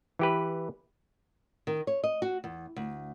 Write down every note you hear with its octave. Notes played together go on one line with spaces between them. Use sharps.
E3 G4 B4
D#3
C#5
D#5
F#4
E2
D2